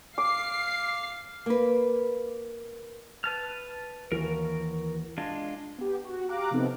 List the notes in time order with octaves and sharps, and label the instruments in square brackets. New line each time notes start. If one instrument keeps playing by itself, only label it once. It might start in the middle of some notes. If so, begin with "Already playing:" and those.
[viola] F5 [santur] D6 [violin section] C7
[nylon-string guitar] A#3 B4
[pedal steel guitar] B4 A5 F6
[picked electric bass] D#2 E3 [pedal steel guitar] F#4 A#4
[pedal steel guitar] G#3 D4 F4
[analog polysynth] B3 G4
F#4
G4 F5 A#5 D6 F#6
C3 F3 B3 C4 D#4 A4